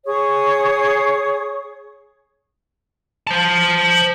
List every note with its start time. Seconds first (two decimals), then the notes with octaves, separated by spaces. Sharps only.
0.05 G#4 C#5 C#6 D#6
3.27 C5 A5